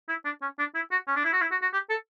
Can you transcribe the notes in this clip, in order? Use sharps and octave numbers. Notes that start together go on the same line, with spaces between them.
E4
D4
C#4
D4
E4
F#4
C#4
D4
E4
F#4
E4
F#4
F#4
G4
A4